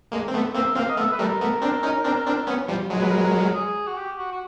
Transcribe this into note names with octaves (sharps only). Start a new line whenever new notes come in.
G#3 A#3
C4
A3 B3
A#3 C4 E5
A#3 C4 F5
D#5
A3 B3 E5
B4
G3 A3 A#4
A3 B3
C4 D4
C#4 D#4
C4 D4
C4 D4
B3 C#4
F3 G3
F#3 G#3
B4
A#4
G#4
F#4
G4
F#4
F#4